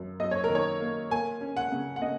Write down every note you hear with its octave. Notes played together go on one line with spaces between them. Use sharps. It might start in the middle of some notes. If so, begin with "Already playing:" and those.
Already playing: F#2 D#3 A#3
F#2 D#5
C#5
A#4
D#3
C#5
A#3
A#3 G#5
C#4
F#5
C#3
F#5
C#3 D#5